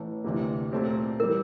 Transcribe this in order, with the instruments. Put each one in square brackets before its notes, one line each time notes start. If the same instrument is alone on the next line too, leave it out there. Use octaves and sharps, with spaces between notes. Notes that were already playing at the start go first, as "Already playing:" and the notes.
Already playing: [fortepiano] A1 A2 E3
D2 C3 E3 A#3
A#2 A3 C4 G4
[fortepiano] E3 G3 [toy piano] A#4